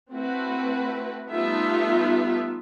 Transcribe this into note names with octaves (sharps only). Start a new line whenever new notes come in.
A3 C4 E4 F#4 B4
G3 A3 B3 D#4 F4 E5